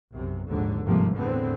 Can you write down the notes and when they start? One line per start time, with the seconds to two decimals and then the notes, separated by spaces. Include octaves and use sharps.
0.12 B1 F#2 C3
0.47 A#1 D#2 G#2 D3
0.85 G1 G#2 C3 F3 G3 A#3
1.17 E2 A2 D3 B3 C4